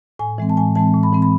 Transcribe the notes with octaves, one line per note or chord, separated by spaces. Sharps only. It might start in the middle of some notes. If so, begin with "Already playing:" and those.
A2 G#5
E3 G#3 C4
A5
A2 G#5
E3 G#3 C4 A5
A2
B5
E3 G#3 C4
B5